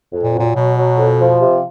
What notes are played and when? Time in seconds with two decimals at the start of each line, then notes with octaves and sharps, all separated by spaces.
0.13 F2
0.23 A#2
0.34 F#3
0.39 A#2
0.55 B2 F#3
0.77 F#3
0.98 F2
1.19 F3
1.40 C3